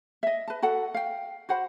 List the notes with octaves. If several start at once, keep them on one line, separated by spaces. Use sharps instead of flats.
D#5 E5
B4 A5
F#4 A4 F#5
F5 G5
F#4 C5 F#5 B5